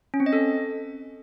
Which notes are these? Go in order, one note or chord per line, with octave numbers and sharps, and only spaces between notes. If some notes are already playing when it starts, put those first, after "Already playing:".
C#4
C4
D#5
A4